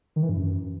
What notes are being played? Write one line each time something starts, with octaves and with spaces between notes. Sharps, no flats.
D#3
E3
G2
F#2